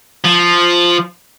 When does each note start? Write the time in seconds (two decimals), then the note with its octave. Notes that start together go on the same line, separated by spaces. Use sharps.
0.24 F3